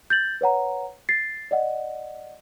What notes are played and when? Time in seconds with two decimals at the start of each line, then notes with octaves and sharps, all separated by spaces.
0.10 G6 A6 F#7
0.41 B4 C#5 F#5 A#5
1.09 A6 C7
1.51 D5 D#5 F#5